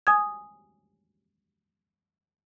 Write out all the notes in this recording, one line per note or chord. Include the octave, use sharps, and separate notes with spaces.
G#5 D#6 G#6